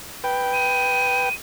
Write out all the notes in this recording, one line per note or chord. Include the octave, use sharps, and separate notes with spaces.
B4 G5
D#7